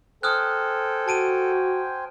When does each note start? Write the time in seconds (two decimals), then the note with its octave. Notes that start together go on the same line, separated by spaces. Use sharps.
0.23 A4 C5 G5 G#5 D#6 F6 F#6
1.08 F#4 A5 D7 D#7